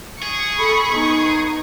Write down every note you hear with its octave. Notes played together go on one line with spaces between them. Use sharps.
G#4 C#6
A4 B5
B3 D#4